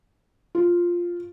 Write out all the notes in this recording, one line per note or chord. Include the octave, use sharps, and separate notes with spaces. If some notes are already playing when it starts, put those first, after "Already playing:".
F4